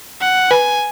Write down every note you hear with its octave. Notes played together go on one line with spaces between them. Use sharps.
F#5
B4 G#5